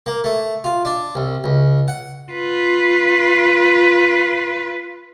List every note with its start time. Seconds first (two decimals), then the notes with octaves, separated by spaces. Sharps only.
0.06 A#3
0.24 A3
0.64 F4
0.85 D4
1.15 C2
1.44 C#2
1.88 F#5
2.32 F4 B4